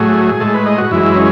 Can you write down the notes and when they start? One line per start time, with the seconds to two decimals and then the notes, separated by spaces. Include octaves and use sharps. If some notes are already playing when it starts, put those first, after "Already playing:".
Already playing: A2 F#3 A3 G#4
0.40 A2 G#3 A4
0.54 B4
0.66 D#5
0.78 F#4
0.91 F#2 E3 G#3 E4
1.16 C#4